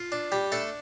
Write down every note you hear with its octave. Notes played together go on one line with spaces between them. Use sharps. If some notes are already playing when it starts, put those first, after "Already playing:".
Already playing: F4
D4
G3 G4
A3 D4 A4